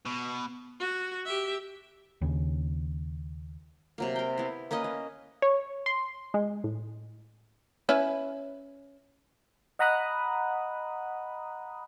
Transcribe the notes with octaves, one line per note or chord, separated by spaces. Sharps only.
B2
F#4
G4 E5
D#2 C#3
C3 F#3 A#3
A#4 G5
B3 E4
A#3 C#4 B4 D#5
A#3
C#5
C6
G#3
A2
C#4 E4 B4
D#5 F#5 A#5 B5 D#6 F#6